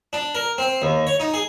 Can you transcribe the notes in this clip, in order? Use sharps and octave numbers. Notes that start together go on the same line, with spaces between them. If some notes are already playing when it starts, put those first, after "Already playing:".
D4
A#4
C4
D#2
C#5
D#4
G#4